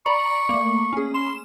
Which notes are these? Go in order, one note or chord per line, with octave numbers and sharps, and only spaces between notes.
D5 A#5 B5 C#6
A3 A#3
C#4 G#4
C6 E7